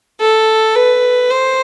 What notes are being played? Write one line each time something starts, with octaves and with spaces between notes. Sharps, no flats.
A4
B4
C5